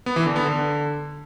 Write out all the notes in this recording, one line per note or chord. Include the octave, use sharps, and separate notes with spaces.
B3
E3
D3
B3
D3